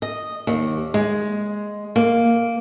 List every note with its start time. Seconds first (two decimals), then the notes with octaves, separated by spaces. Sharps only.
0.02 D#5
0.47 D#2
0.94 G#3
1.96 A#3